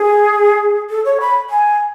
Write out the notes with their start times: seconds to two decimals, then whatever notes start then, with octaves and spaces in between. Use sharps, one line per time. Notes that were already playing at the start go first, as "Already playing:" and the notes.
Already playing: G#4
0.90 A4
1.05 C#5
1.20 B5
1.50 G#5